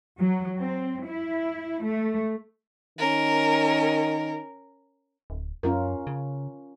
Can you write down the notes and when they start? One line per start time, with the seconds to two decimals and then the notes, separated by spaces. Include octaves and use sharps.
0.18 F#3
0.60 C4
1.05 E4
1.85 A3
2.98 D#3 C#4 A#4
5.30 D1
5.63 F#2 C#4 F4 A#4
6.07 C#3